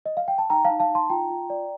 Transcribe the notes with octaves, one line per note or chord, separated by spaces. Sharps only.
D#5
F5
G5
A5
D#4 G5 A#5
F5 A5
D#4
F5 A5
D#4
A5 C6
F4 G5 A#5
F4
D5